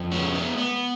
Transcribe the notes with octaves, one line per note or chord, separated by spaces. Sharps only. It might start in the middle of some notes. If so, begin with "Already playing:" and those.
Already playing: F2
G#3 B3 C#4
B3
B3